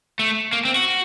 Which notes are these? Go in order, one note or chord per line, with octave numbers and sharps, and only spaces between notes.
A3
A#3
C4
F#4